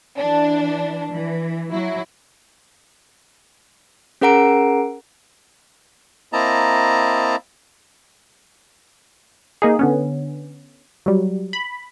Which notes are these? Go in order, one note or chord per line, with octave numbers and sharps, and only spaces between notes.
E3 D4
E3
F#3 E4
C#4 G#4 A#4 F#5 A#5 D7
A#3 C4 E4 D#5 A5 A#5
A#3 D#4 G#4
D3 B3 C#4
F#3 G3
B5